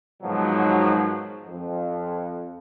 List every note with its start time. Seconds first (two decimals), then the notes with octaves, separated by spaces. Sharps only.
0.22 G#2 B2 D#3 F3 F#3
1.46 F2